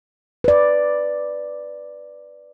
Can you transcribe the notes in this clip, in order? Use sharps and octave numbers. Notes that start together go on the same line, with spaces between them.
B4 D5